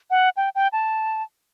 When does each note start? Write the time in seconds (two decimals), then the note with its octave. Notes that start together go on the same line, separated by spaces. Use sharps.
0.11 F#5
0.37 G5
0.55 G5
0.73 A5